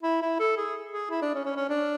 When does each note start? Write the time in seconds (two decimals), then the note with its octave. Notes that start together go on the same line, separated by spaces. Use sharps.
0.03 E4
0.22 E4
0.40 A4
0.57 G#4
0.92 G#4
1.11 E4
1.22 D4
1.34 C#4
1.45 C#4
1.57 C#4
1.70 D4